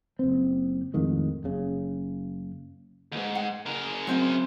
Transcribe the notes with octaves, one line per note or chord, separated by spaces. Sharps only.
F#1 C4
F2 A2 D#3 G#3
F#1 C#3
D#2 G#2
F#5
C#3 A#4
F#3 C4 E5